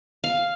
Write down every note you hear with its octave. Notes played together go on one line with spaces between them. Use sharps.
F5